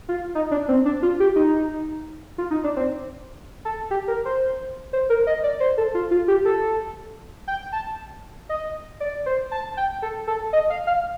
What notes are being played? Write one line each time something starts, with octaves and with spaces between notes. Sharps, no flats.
F4
D#4
D4
C4
D4
F4
G4
D#4
F4
D#4
D4
C4
A4
G4
A#4
C5
C5
A#4
D#5
D5
C5
A4
F4
F4
G4
A4
G5
A5
D#5
D5
C5
A5
G5
A4
A4
D#5
F5
F5